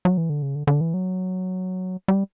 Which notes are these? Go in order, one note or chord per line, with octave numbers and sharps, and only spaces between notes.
F#3
E3
D3
C#3
D3
D3
E3
F#3
G3